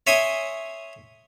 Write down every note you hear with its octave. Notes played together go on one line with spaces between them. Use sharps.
C#5 E5 G#5 C6 D#6